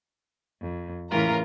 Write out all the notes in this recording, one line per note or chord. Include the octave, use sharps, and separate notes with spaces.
F2
A2 C#3 E3 F4 A#4 A#5